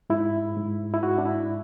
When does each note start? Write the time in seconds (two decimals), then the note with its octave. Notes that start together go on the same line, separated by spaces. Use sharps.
0.10 G#2 E4
0.57 G#2
0.94 E4
1.03 G#2 F#4
1.18 D4
1.26 E4